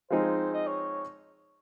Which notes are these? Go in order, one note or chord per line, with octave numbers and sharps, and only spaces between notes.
F3 G#3 C4 D#4 G#4 C5
D#5
C#5